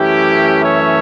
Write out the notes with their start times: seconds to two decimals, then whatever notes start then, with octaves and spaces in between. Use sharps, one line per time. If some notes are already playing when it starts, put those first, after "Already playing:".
Already playing: F#2 E3 A3 C#4 E4 G4
0.63 C#5 E5